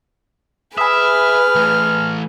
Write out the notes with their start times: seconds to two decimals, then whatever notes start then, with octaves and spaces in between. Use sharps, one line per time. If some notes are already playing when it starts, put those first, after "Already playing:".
0.78 G#4 B4 E5 G#5 B5 D#6 F6
1.55 E3 A3